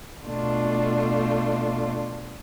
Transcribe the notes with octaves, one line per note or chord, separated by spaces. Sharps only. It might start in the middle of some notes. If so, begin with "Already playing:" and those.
B2 A3 D4 F4